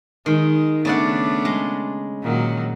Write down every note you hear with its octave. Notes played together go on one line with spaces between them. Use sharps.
D#3 G#3
C#3 A3 B3 D4 D5 F#5
G#3
A#2 D#3 F#3